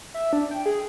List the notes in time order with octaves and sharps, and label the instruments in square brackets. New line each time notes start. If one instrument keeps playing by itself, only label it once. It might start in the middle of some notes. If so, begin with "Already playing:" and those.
[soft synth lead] E5
D4
G5
G#4